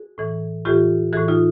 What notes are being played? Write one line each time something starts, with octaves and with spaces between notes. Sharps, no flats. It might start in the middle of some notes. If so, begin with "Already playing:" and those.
Already playing: F#4 G#4
A2 E3
A2 E3 F4 G4
A2 E3 F#4 G#4
D#4 F4